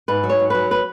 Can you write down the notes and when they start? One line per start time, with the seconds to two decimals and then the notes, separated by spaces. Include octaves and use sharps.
0.08 G#2 B4
0.23 F#3
0.29 C#5
0.40 G#2
0.50 F#3 B4
0.71 B4